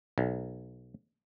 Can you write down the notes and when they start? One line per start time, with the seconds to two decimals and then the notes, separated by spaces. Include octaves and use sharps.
0.18 B1